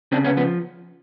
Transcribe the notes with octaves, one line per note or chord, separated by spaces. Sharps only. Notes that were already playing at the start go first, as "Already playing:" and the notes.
C#3 C4 D4
B3 C#4
F3 B3